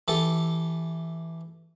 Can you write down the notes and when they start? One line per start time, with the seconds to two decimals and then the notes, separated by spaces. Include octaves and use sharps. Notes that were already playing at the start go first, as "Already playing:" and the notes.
0.08 E3 G4 A4